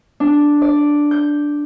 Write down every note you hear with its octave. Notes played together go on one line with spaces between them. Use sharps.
D4
D5
G6